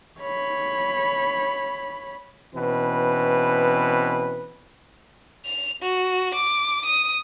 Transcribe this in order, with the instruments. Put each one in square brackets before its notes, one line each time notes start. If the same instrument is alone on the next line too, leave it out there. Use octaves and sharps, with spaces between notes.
[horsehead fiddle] C#5 B5
[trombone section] B2 E3 C4 C#4 B4
[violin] F7
F#4
D6
D#6